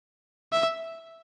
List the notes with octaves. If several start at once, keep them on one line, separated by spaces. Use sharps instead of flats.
E5